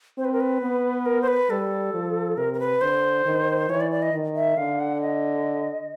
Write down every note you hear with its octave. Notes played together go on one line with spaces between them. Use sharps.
C4 C5
B4
A#4
B4
B3
A#4
C5
B4
G3 A4
F3
C3 A#4
A#4
B4
D3 C5
D#3
E3 C#5
D5
D5
D#5
D#3
E5
D3 F5
F#5
D#5